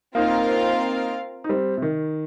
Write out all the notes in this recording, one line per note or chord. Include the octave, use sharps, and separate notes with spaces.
A#3 C4 D#4 F4 A#4 F5
D#4
G3 C4
C3
D#3